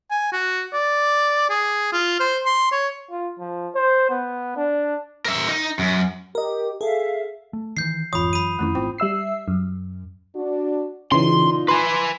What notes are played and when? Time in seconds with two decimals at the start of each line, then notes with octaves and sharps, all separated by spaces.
0.11 G#5
0.32 F#4
0.73 D5
1.50 G#4
1.92 F4
2.20 C5
2.46 C6
2.72 C#5
3.11 F4
3.39 F3
3.76 C5
4.10 B3
4.56 D4
5.25 A#4 E5
5.48 D#4
5.79 F#2
6.35 G4 A#4 D#5
6.81 G#4 A4 E5 F5
7.53 A3
7.77 D#3 E3 G6 C7
8.13 G#1 F2 E3 F4 B5 D#6
8.33 F#2 B5 D#7
8.59 F2 D#3 A3 C#4 E4
8.75 G#1 C4 F4 C5 G5
8.98 G3 E5 E6 C7
9.48 F#2
10.36 D4 F#4
11.12 A#2 C#3 E3 D#4 F4 C6
11.68 B4 G#5 C6